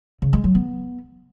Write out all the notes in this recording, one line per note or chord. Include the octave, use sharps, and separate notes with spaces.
C#3
G#3
F#3
B3